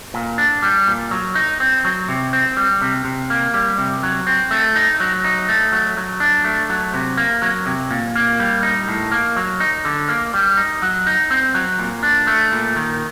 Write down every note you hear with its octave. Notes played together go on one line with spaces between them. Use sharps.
A#2
D4
G3
A#2
F#3
D#4
C4
F#3
C3
C4
G3
C3
C3
A#3
G3
C3
F#3
C4
A3
D#4
F#3
D#4
A3
F#3
F#3
D4
A3
F#3
C3
A#3
F#3
C3
A#2
A#3
G3
D#4
A2
A#3
F#3
D#4
D3
A#3
G3
D#4
F#3
D#4
C4
F#3
A#2
D4
A3
A#2
D#3